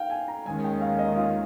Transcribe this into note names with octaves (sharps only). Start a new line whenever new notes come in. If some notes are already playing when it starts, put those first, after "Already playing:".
Already playing: F5 G5
G#5
A#5
D#2 D#3 G#3 C#4 G#5
G5
F5
D#5
F4